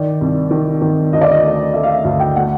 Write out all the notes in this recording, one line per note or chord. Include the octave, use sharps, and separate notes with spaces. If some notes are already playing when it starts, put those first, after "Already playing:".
Already playing: D#3 D5
C2
D#3
D#3
D2 D#5
D5
D#5
A3
A3 E5
F5
E5
D2 F5
G5
A3 F#5